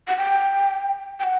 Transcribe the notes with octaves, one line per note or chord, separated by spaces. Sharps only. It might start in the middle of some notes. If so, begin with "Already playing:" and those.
F#5
G5
G5
F#5